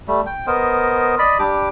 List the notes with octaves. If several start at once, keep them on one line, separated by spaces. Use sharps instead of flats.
G3 A3
G5
B3 A#4 C5 D#5
D5 D#5 B5
G3 D4 G4 D6